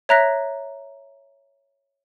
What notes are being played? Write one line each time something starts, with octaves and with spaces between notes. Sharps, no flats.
C#5 E5 A#5 F#6 A#6 B6